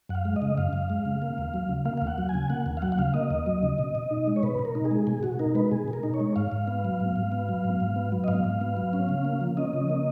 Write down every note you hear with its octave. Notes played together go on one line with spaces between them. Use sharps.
F#2 F#5
F5
G#3
D#5
C#3
F#2 F5
F#2
G#3
C#3
A#3
D#2
F#3
C#3
A#3 F5
D#2 F5
F#5
F#3
G#5
C#3
A#3 F#5
D#2
F5
F#3 F#5
F#5
C#3 F5
A#3 D#5
D#2
F#3
C#3
B2
B2
D#4
G#3
C#5
B2 B4
B2
A#4
D#4
G#4
G#3
B2 G#4
B2 F#4
D#4 A#4
G#3 B4
B2 G#4
B2
A#4
D#4
C#5
G#3
G#2 F5
G#2
B3
F#3
G#2
G#2
B3
F#3
G#2
G#2
B3
F#3
D#5
G#2 F5
G#2
B3
F#3
C#4
C#3
A#3
F3
C#4 D#5
C#3
A#3